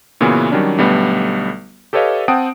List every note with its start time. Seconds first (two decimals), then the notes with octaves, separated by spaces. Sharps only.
0.21 A#2 C#3 E3 B3 C#4 F#4
0.52 D#3 F#3 G3 C#4 D4
0.78 B1 D3 G3 A3 B3
1.93 G4 A4 B4 C#5 D#5 F5
2.28 C4 F#5 G5 A5 D#6 D7